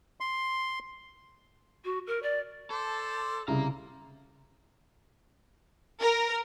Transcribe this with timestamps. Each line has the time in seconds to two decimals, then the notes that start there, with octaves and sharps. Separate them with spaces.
0.20 C6
1.85 F#4
2.07 A#4
2.23 D5
2.70 A4 C5 D5
3.48 C2 C#3 F5 A#5
6.01 A#4